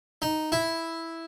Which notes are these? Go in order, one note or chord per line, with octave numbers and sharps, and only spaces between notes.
D#4
E4